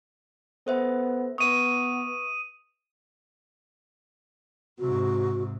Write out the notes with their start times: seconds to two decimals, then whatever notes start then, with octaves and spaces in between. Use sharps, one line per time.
0.67 B3 A4 C5 E5
1.38 B3 B4 E5 C#6 D#6 D#7
4.79 G#2 C3 F#4